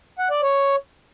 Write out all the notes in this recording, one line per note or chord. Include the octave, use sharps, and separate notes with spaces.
F#5
D5
C#5